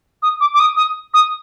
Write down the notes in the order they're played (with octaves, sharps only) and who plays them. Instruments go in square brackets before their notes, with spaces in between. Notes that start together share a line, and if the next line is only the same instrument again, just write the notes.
[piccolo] D#6
D6
D6
D#6
D#6
D#6